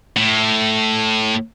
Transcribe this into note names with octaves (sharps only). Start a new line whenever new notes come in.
A2